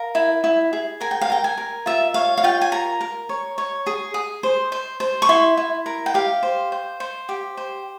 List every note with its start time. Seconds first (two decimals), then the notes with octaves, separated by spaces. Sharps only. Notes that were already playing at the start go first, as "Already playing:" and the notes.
Already playing: A#4 F5
0.15 E4
0.44 E4
0.73 G#4
1.01 A#4 G#5
1.11 G5
1.21 F5
1.30 A#4 G5
1.44 G#5
1.58 A#4
1.86 F4 E5
2.14 C#5 F5
2.37 F5
2.43 F4 G5
2.61 G#5
2.72 A#4 A#5
3.01 A#4
3.29 C#5
3.58 C#5
3.86 G#4
4.14 G#4
4.43 C5
4.72 C5
5.00 C5
5.22 C#6
5.29 E4 C6
5.57 E4
5.86 A#4
6.06 G5
6.14 G4 F5
6.43 C5
6.72 C5
7.00 C5
7.29 G4
7.57 C5